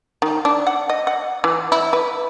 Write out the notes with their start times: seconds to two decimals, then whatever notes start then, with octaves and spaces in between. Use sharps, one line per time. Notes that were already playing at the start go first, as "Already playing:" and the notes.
0.22 D#3
0.45 D4
0.67 F#5
0.89 D#5
1.07 F#5
1.44 E3
1.72 E4
1.93 B4